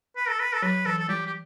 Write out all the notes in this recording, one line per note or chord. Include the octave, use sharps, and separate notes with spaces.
B4
A4
B4
A4
F#3 B4
E3 A4
A4
G3 G4
G4